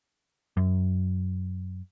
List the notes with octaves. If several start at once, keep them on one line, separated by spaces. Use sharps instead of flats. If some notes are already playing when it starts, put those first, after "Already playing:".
F#2